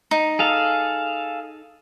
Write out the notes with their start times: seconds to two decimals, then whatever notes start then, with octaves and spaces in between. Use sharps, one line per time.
0.11 D#4
0.39 G#4 A4 F5